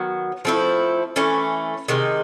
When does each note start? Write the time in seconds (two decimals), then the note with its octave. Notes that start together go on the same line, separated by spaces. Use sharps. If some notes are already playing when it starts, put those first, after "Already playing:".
Already playing: D#3 F#3 B3
0.45 F3 A3 C4 E4
1.16 E3 A3 C#4
1.88 C3 D#3 G#3